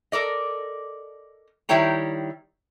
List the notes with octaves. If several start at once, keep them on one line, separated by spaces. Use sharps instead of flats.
A4 A#4 D5 D#5
D#3 G3 E4 C#5 G5 A#5